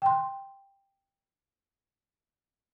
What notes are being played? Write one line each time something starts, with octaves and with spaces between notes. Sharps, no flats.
G5 C6